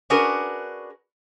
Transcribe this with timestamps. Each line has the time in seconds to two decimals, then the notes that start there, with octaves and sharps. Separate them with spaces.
0.10 C#4 D4 F#4 G#4 A#4 B4